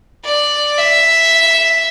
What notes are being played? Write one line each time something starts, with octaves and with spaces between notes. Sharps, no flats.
D5
E5